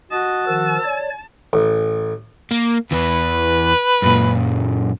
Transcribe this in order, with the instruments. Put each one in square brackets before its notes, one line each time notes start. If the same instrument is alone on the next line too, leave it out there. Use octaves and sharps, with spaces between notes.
[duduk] F#4 [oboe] D#5 [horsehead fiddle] A5
[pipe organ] D#3 F3 A#4 [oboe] E6
[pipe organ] C#5 D5
[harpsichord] A1
[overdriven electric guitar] A#3
[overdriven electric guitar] E2 E3 [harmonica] B4
[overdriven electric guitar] F#2 A#2